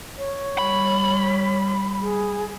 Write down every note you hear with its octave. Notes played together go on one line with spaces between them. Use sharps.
C#5
G3 B5
G#4